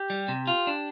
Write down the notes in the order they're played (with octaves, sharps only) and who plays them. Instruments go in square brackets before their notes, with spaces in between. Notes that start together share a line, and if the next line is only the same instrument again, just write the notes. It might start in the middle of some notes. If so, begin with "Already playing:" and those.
Already playing: [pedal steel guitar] G4
[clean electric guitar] G3
C3
F4
D4